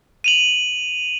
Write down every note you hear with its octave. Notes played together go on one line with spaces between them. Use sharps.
D#7 F7 F#7